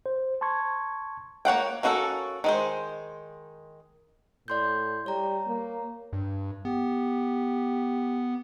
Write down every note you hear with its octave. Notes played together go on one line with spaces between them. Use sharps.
C5
A5 C6 C#6 G#6
A#3 C#5 F#5 G5
A#3 C#4 F#4 G#4 A4
D#3 G#3 C5
A2 D5 C6 G6
G3 C#5 A#5
A#3
G2
B3 G4